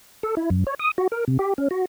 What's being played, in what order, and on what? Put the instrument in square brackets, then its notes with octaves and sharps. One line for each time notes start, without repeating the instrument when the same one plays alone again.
[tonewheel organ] A4
E4
F#2
C#5
D#6
F#4
A#4
C3
G4
C#4
F#4